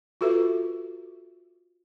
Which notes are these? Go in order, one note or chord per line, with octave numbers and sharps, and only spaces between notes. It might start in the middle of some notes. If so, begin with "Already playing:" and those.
F4 F#4 A4 B4 E5